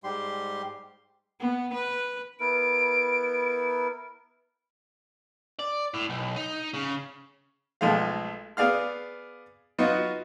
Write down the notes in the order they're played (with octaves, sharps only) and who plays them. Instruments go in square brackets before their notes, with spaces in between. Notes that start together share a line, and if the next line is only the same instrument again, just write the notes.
[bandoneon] G#2 G3 G4 C6
[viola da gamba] B3
B4
[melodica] B3 E4 A#4 [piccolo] D7
[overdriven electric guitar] D5
A2
B1
D#4
C#3
[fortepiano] B1 F3 G#3 A3 F5
B3 G#4 D5 F5 F6
F#3 B3 D#4 F4 F#4